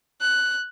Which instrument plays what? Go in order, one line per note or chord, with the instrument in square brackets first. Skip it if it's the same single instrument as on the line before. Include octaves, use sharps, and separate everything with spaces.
[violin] F#6